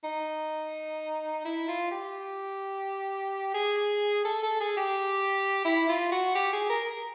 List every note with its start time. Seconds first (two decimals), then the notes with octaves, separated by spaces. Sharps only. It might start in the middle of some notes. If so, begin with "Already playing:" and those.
0.04 D#4
1.45 E4
1.68 F4
1.91 G4
3.54 G#4
4.25 A4
4.43 A4
4.61 G#4
4.77 G4
5.65 E4
5.89 F4
6.12 F#4
6.35 G4
6.53 G#4
6.70 A#4